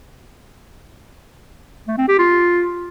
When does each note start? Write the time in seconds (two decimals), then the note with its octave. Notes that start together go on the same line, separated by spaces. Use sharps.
1.88 A3
1.98 C4
2.08 G4
2.19 F4